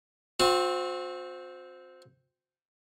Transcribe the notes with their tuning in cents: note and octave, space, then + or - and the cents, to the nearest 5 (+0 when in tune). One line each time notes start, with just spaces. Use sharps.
C4 -5 F#4 -45